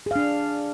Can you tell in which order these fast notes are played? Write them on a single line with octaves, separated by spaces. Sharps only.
G#4 F5 D4